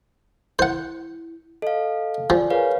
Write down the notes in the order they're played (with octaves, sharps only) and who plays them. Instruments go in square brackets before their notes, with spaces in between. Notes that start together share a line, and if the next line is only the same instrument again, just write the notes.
[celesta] E4 [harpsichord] C5 F#5
[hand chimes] A4 F5 [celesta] D#5
[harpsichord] F3 [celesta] D5 G#5
[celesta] G#4 A#4 G#5 [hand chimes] B4 C#5 F5